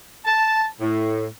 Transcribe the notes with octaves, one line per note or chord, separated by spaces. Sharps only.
A5
A2